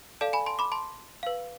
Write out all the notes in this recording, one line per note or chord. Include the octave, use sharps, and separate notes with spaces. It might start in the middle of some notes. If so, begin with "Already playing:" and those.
A4 D5 F5 A5
G#5 B5
A5 C6
B5 D6
A5 C6
B4 F5